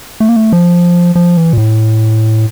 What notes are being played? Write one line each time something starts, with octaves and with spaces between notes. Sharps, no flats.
A3
A#3
A3
F3
F3
E3
A#2
A2